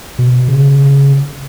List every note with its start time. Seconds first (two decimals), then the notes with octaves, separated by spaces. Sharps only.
0.19 B2
0.48 C#3